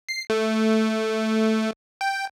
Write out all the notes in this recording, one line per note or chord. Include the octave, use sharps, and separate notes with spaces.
C7
A3
G5